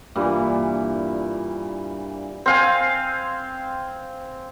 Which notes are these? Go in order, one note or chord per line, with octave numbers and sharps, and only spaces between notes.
G2 A#2 E3
C4 F5 G#5